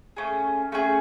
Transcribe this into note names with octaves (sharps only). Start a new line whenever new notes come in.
A3 C#4 G#4
A3 C#4 G#4